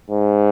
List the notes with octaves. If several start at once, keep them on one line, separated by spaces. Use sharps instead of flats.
G#2